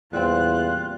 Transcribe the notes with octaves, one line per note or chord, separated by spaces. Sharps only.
E2 A#2 G3 C4 F4 F#6